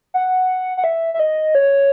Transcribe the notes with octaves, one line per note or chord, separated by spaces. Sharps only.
F#5
F#5
E5
E5
D#5
C#5